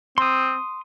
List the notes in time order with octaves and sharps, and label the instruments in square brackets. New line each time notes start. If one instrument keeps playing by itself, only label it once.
[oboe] C4 [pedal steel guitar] C6 D#6